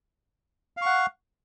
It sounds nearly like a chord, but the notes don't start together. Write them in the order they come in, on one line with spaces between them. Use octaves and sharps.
F5 C#6 F#5